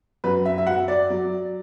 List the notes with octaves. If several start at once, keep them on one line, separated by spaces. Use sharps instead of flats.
F#2 B4
E5
E5
F#3 F#5
D5
F#3